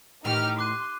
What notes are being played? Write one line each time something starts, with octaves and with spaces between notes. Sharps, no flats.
A2 D#3 E3 D#4 G4 F6
C6 D6 F#6 D#7